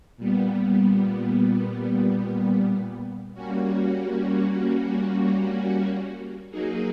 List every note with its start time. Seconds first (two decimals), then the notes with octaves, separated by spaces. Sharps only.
0.17 A#2 G3 B3
3.34 G3 A#3 C#4 F#4
6.51 F#3 A#3 D#4 G#4